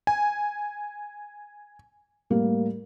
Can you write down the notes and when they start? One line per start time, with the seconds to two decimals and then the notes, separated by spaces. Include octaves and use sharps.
0.07 G#5
2.30 A2 G3 A#3